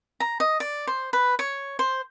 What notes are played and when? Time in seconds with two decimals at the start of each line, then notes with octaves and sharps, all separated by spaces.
0.20 A#5
0.40 D#5
0.60 D5
0.87 C5
1.13 B4
1.39 C#5
1.79 C5